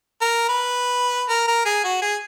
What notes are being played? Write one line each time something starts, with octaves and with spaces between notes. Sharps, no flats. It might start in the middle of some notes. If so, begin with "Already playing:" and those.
A#4
B4
A#4
A#4
G#4
F#4
G#4